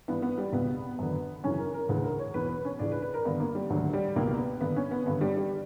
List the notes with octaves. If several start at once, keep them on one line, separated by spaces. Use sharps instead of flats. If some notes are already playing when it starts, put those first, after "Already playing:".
G2 E3 B3
B3
G3
C#2 B2 B3
F#2 D3
F#2 C#3 E3 C#4
A#4
A#4
D2 C#3 E3 B4
A#4
C#5
E2 B2 B4
B4
C#4
C#2 C#3 E3 D4
B4
B4
A#4
G2 D3 B3
A#3
G3
D2 D3 F#3
G3
C#2 B2 A#3
B3
G2 D3 B3
C#4
B3
G2 D3 B3
G3
G3